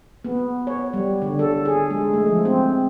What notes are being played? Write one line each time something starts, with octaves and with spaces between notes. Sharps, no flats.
B3
C#5
G3
D3
A4
G#4
G#3
A3
F3
C4